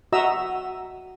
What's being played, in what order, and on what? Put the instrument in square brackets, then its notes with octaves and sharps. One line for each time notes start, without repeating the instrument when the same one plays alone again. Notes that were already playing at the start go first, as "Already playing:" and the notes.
[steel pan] F#4 D#5 E5 A#5 E6